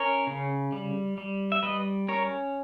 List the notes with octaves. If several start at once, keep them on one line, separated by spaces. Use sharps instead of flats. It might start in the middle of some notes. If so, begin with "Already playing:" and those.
Already playing: C#4 A#4 C#5
C#3
G3
G3
E5
G3 B4 D#5
C#4 A#4 C#5